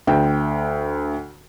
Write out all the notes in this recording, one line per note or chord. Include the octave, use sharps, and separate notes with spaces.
D2 G5